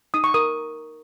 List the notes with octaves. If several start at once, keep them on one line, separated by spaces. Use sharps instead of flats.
D#4 D#6
C#6
A#4 D#6